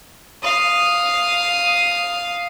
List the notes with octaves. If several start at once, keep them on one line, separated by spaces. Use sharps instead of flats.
F5 D#6